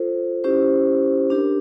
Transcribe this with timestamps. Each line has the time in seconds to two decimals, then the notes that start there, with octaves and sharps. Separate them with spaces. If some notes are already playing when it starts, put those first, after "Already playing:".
Already playing: F4 A4 C5
0.44 C#4 E4 G4 C5
1.30 D4 G4 A#4